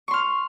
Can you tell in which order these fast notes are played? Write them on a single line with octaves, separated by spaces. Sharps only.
C#6 C6 F6